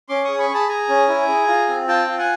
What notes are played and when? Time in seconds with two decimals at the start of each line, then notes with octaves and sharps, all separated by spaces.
0.09 C#4 C6 D6
0.25 G#4 C#6 D#6
0.38 B5 C#6
0.50 G#4 A5 B5
0.69 G#4 G#5 A#5
0.89 C#4
1.08 E4
1.28 G#4
1.48 F4
1.69 C4
1.88 F4 G5 A5
2.08 F4
2.18 F#5 G#5